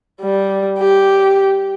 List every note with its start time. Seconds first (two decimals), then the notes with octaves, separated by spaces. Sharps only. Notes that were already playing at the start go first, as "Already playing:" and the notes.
0.21 G3
0.78 G4